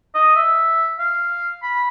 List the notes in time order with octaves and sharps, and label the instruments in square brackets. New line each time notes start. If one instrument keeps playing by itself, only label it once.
[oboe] D#5
E5
F5
B5